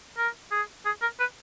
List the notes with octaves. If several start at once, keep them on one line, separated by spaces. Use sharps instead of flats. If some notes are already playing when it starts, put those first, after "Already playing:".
A#4
G#4
G#4
A#4
B4